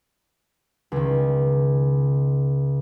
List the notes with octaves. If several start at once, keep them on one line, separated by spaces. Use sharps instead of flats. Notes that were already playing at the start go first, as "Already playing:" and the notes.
C#2 D#3